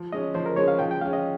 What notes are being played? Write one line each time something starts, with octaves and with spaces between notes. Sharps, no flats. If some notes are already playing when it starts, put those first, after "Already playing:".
Already playing: F3
G#3 C#4 D#5
F3 C5
A#4
G#3 C#4 C#5
F5
F3 G5
G5
G#3 C#4 F5
D#5